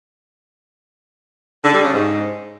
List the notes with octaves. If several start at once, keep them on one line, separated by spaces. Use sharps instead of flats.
D3
G3
C#3
G#2